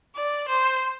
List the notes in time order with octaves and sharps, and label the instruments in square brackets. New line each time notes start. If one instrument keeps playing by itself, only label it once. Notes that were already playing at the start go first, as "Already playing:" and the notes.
[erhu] D5
C5